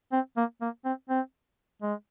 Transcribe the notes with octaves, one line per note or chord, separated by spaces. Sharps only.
C4
A#3
A#3
C4
C4
G#3